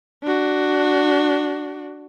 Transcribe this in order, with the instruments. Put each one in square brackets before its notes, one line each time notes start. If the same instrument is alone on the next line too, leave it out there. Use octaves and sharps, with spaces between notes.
[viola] D4 F#4